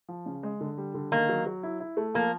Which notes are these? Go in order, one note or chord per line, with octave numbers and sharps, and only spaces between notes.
F3
C#3
G#3
D3
G3
D3
D#3 A#3
F#3
F#3
E4
E4
A3
F3 A#3